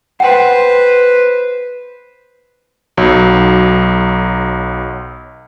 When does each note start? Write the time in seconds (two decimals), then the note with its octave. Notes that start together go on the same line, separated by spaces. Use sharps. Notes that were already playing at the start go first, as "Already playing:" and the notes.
0.20 B4 C5 F#5 G5 C6
2.97 B1 F#3